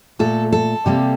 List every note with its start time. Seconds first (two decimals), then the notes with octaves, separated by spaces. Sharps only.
0.19 A#2 A3 A4
0.52 A4
0.86 C3 G3 A#3